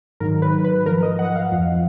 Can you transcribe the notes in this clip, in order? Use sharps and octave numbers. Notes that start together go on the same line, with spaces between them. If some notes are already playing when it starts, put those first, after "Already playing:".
G#2 D#3 F#3 A#4
B4
B4
G#2 F3 A#4
D#5
F#5
F5
F2 F3